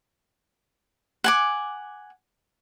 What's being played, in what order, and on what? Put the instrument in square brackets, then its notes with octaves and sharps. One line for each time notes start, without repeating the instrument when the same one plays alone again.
[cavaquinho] F#5 G#5 D6